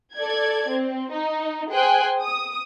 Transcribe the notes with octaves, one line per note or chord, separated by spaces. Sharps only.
A4 D5 G#6
C4
D#4
G#4 C5 G5 G#5 F#6
D#6